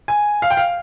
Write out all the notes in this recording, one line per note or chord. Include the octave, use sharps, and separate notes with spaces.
G#5
F5
G5
F5